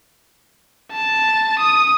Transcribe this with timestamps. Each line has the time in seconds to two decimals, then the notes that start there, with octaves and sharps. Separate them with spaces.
0.92 A5
1.59 D#6